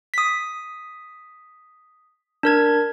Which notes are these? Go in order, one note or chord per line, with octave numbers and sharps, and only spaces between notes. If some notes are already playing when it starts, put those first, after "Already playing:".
D#6 B6
D4 A#4 G#6